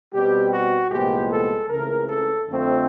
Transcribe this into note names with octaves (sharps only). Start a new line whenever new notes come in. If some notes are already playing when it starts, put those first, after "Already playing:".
B2 G3 C4 G4
F#4
C2 A#2 F3 G#3 B3 G4
A4
C#2 C#3 E3 A3 C4 A#4
A4
F2 D3 F3 A3 C4